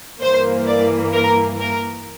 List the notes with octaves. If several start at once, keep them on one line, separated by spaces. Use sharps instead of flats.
G2 E3 A#3 C5
D5
A#4
A#4